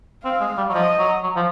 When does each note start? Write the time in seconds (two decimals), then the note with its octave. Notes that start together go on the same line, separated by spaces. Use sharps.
0.24 C4 F5
0.40 G#3
0.57 G3
0.69 F#3
0.73 F3 D#5
0.99 F#3
1.23 F#3
1.36 F3